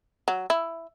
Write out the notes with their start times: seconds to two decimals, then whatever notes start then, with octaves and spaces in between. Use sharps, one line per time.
0.28 F#3
0.50 E4